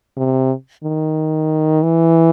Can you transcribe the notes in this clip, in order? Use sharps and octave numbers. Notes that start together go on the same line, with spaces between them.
C3
D#3
E3